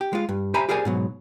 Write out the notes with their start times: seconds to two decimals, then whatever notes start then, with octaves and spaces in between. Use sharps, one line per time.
0.01 G4
0.13 G#3 F4
0.29 G2
0.54 G4 C5 E5 G#5 A#5 B5
0.69 G4 G#4 A#4 C5 D5 G#5
0.85 G#2 B2 F#3